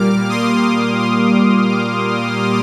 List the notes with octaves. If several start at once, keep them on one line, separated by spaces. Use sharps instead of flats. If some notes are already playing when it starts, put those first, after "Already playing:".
Already playing: A#2 G3 A#3 D6 F6
C6 D#6
C6 D#6
D6 F6